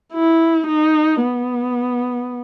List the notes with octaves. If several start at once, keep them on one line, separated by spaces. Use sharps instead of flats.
E4
D#4
B3